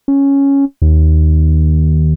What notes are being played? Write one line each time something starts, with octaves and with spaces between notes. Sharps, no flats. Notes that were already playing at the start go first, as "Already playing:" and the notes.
C#4
D#2